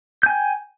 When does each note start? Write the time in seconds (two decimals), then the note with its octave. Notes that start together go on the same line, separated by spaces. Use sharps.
0.23 G6
0.26 G#5
0.29 G5